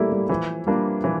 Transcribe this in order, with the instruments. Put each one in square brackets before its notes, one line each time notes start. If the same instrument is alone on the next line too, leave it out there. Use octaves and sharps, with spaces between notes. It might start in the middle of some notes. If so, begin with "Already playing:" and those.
Already playing: [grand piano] E3 A#3 E4 [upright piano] G3 A3
[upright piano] G3
[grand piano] E3 [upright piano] F3
[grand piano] G3 A#3 D4 F4
[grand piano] E3 [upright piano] F3